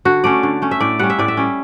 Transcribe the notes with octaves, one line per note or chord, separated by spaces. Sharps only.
D3 F#4
A3 C#4 D5
D3
A3 C#4
E5
A2 D5
G3 C#4 F#5
E5
A2 D5
E5
G3 C#4